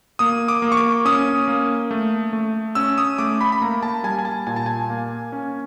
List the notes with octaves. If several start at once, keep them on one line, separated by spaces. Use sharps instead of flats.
A#3 D#6
D6
A#3
C#6
D6
C#4 D#6
A#3
A3
A3
C#4 E6
D#6
A3 D6
B5
B5
A#3 A#5
A5
G3 G#5
G#5
A5
A#2 G#5
A5
G#5
A#3
C#4